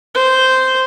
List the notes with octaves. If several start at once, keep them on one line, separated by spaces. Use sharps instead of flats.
C5